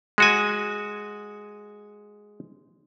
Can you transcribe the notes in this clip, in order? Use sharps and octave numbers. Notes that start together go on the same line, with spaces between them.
G#3 F#4 G#5